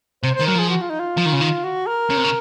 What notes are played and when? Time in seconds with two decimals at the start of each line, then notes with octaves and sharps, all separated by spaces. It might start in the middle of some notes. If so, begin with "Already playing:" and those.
0.23 C3 C5
0.35 D#3 C5
0.47 F#3 A#4
0.55 F3 G#4
0.70 F#4
0.81 F4
0.90 D#4
1.00 F4
1.17 F3
1.25 D#3
1.33 C#3
1.41 D#3
1.64 F#4
1.87 A#4
2.10 C#3
2.17 C3
2.25 C#3